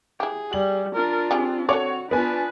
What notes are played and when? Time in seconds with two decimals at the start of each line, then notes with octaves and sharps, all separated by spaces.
0.20 E4 G4 G#4
0.53 G3 F#7
0.95 D4 F4 A#4
1.31 G3 C4 G4 G#4
1.69 D3 D#3 F#4 C#5 D5
2.11 B3 D4 F4 B4 G#5